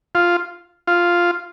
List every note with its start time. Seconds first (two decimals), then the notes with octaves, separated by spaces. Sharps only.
0.15 F4
0.87 F4